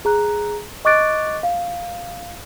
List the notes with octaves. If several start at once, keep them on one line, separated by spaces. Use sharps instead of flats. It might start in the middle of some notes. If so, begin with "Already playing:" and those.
G#4 A#5 F#6
D#5 C#6 D6 F#6 A6 D7
F5